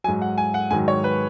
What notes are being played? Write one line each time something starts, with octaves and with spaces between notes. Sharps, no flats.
G#2 F#3 G#5
F#5
G#5
F#5
G#2 D#3 F#3 G#5
C#5
B4